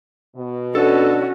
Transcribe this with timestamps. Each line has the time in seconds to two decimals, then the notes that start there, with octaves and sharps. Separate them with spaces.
0.36 B2
0.75 C#4 D4 F#4 A4